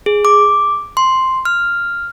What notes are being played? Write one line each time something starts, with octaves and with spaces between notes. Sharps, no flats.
G#4
D6
C6
F6